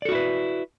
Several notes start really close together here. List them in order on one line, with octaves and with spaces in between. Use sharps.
D5 A4 F#4 E4 B4